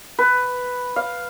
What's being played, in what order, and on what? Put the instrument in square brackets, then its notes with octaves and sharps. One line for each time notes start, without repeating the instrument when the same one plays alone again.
[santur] B4
F5